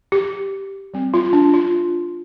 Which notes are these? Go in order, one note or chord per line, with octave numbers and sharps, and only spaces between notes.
G4
G3 C4
F4
D4
F4